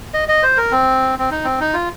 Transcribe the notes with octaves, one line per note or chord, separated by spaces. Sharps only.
D#5
D#5
C5
A#4
C4
C4
D#4
C4
D#4
F4